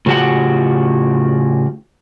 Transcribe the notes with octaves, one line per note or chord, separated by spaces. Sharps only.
A2 C#3 F3 F#4 G4 F#5